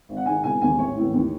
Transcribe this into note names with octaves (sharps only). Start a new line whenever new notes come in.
G#1
F#5
G#2 D#3 G#5
E1 G#5
D#2 D#3 G#5
A1 C#5
A2 E3
D#2